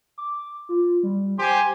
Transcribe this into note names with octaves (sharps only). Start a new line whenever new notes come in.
D6
F4
G3
G4 C5 G#5 C6